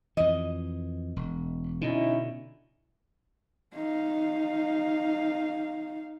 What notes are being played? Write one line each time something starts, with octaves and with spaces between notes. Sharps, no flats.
F2 E3 D#5
E1
B2 D3 C#4 D#4 E4
D#4 F5